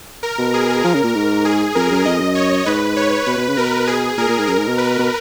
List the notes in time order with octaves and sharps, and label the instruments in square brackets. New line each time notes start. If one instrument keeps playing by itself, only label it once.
[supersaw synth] A#4
[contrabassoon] B2
[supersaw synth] G#4
[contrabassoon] F3 [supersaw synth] A#4
[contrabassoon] C#3
A#2
G#2
[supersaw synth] G#4
[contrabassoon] F2 [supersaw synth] A#4
[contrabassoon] F#2
[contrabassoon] F2 [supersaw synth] D#5
[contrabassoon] F#2
[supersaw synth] C#5
[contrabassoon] G#2 [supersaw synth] B4
[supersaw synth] C#5
[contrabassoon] B2 [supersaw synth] B4
[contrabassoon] B2
C#3
[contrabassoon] B2 [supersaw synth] A#4
[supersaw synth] G#4
[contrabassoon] A#2 [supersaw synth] A#4
[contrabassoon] A#2
G#2
[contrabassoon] F#2 [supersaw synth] A#4
[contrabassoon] G#2
B2
[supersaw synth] B4
[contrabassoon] B2